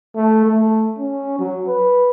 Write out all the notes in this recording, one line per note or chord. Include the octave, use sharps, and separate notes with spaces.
A3
A3
C#4
F#3
B4